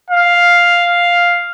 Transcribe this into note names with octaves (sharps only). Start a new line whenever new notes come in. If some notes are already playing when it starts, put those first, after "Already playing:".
F5